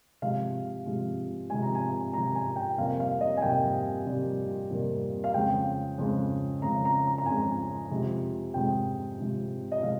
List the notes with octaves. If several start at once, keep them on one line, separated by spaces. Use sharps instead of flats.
C3 F3 G#3 F5
C3 F3 G#3
C3 F3 G#3 G#5
A#5
G#5
C3 F3 G#3 A#5
G#5
G5
F2 C3 G3 A#3 F5
F5
D#5
G#5
F2 C3 G3 A#3 G5
F2 C3 G3 A#3
F2 C3 G3 A#3
F5
F2 C#3 G#3 G5
F2 C#3 G#3
F2 C#3 G#3 A#5
A#5
A#5
A#5
F2 C#3 G#3 G#5
F2 C3 F3 G#3
F2 C3 F3 G#3 G5
F2 C3 F3 G#3
D#5
C3 F3 G#3 F5